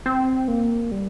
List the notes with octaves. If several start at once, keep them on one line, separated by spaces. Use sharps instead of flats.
C4
A#3
G3